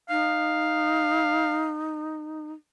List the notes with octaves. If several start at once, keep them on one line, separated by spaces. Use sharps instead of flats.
D#4 F5